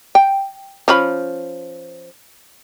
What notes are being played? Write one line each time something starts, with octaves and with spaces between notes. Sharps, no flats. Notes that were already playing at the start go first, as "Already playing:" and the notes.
G5
F3 C#4 B5